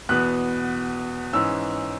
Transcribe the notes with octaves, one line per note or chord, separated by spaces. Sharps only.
E2 B2 B3 F#6
G#2 E3 C#4 E6